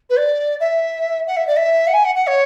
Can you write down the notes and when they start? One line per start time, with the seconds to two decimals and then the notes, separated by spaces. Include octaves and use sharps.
0.10 B4
0.18 D5
0.60 E5
1.27 F#5
1.37 E5
1.47 D5
1.57 E5
1.87 F#5
1.94 G#5
2.05 F#5
2.15 F#5
2.27 C#5